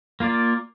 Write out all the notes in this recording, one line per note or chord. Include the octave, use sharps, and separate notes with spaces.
A#3 F4 A#4 D5